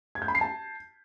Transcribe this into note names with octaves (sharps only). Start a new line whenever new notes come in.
G#6
G6
B5
C7
A5